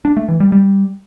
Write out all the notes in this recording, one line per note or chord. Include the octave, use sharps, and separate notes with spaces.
D4
A3
E3
G3
G3